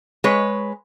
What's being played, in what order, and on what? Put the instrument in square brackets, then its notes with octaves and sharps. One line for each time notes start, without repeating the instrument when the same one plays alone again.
[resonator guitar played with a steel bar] G#3 B4 C#5